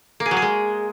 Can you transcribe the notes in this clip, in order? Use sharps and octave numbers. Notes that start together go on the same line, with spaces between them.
A#3
G#4
F#3
G#4
G#3